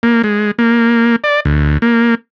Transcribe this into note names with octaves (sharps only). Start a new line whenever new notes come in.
A#3
G#3
A#3
D5
D2
A#3